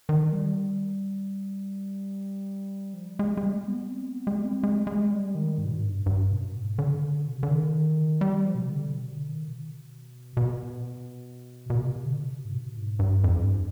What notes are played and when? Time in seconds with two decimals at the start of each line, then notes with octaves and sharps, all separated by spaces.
0.09 D#3
0.33 G3
2.94 F3
3.07 G3
3.19 G#3
3.37 G#3
3.43 G3
3.57 G#3
3.68 B3
3.91 C4
4.09 B3
4.27 G#3
4.45 C4
4.63 G#3
4.87 G#3
5.11 G3
5.35 D#3
5.58 G#2
5.66 B2
5.73 G#2
5.83 G2
6.06 G2
6.31 B2
6.54 G#2
6.79 D3
7.27 B2
7.34 C3
7.43 D3
7.50 D#3
8.21 G3
8.45 F3
8.55 B2
8.63 C3
8.70 D3
8.93 B2
9.12 D3
9.29 D#3
9.48 B2
10.37 B2
11.70 B2
11.80 C3
12.05 D3
12.24 B2
12.28 C3
12.45 G#2
12.53 B2
12.77 G#2
12.99 G2
13.24 F2
13.38 G2